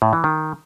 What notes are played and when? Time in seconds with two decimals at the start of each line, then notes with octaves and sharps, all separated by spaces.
0.02 A2
0.13 E3
0.24 D#3